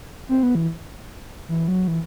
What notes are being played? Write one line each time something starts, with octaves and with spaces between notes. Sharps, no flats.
C4
B3
E3
E3
F#3
E3